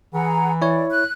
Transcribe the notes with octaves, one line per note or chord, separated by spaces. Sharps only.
E3 G#4 F#5 A#5
E4 C#5 D5
F#6